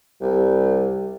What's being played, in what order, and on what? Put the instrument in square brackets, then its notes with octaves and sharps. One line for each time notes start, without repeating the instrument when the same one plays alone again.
[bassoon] C2 [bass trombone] G3